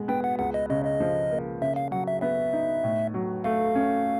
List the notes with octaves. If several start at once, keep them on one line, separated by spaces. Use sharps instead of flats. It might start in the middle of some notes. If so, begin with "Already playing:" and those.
Already playing: B2 G#3
B3 G5
F#5
C#2 F#5
D#5
C#3 D#5
D#5
F3
A#3
C#3 E5
F5
F#3 F#5
E5
B3 E5
D#4
A2
F#3
A3 F5
C#4